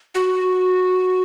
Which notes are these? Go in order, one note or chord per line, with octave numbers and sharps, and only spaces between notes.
F#4